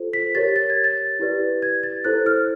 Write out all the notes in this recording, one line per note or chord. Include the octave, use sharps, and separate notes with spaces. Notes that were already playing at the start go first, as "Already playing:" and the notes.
Already playing: F4 A4 C5
B6
G4 A#4 C#5 A6
A6
G#6
A6
E4 G4 B4 D5
G#6
A6
E4 A4 C5 F#6
F6